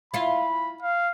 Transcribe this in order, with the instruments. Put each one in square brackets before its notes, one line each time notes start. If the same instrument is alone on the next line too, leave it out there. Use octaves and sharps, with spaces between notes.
[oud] E4 F4 [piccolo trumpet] B5
[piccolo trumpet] F5